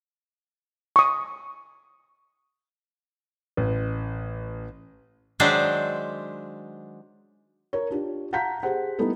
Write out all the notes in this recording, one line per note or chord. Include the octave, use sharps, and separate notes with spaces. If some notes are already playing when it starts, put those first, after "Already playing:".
C#6 D#6
A1
D#3 F#3 G#3 D4 C5 E5
A#4 C#5
D4 F4 G4
F5 F#5 A5 A#5 G6 B6
G4 G#4 C5 F#5
G3 A3 B3 D#4 E4 A4